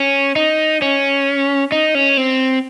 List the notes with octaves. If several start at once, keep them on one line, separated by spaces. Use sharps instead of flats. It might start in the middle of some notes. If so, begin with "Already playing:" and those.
Already playing: C#4
D#4
C#4
D#4
C#4
C4